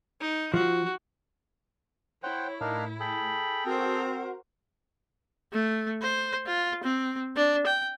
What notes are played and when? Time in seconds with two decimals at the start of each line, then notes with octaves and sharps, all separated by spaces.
0.20 D#4
0.54 F3 F#4
2.23 E4 C5 C#5 F#5 G5
2.61 A2 D4 D#4 A#4 F5
3.00 G#4 A4 G5 B5
3.66 C4 F#4 A#4 C5
5.53 A3
6.02 C5
6.46 F4
6.84 C4
7.37 D4
7.66 G5